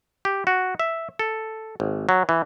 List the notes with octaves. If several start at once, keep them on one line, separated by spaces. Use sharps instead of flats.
G4
F#4
E5
A4
G#1
F#3
E3